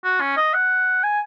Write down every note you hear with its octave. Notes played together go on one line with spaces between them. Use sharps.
F#4
C#4
D#5
F#5
G#5